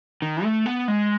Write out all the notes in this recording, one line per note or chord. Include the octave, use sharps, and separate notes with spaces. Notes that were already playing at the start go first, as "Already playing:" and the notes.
D#3
A3
B3
G#3